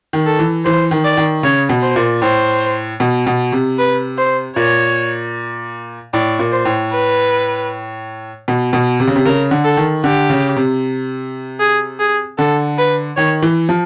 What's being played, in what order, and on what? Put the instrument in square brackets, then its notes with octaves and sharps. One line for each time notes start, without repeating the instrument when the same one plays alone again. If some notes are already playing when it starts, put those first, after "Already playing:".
[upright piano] D#3
[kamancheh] A4
[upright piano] E3
[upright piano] E3 [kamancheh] C5
[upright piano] D#3
[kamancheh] D5
[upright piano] D#3
[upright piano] C#3 [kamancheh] C#5
[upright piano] B2
[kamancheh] C5
[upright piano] A#2
[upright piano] A2 [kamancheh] C5
[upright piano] B2
B2
C3
[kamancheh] B4
C5
[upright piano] A#2 [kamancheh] C#5
[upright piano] A2 [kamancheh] D5
[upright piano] A#2
[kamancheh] C5
[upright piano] A2
[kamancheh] B4
[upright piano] B2
B2
C3
C#3
C3
[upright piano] C#3 [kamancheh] A#4
[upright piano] D3
[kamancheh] A4
[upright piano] D#3
[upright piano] D3 [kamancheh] G4
[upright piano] C#3
C3
[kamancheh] G#4
G#4
[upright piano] D3 [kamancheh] A4
[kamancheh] B4
[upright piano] D#3 [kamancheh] C#5
[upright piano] E3
F3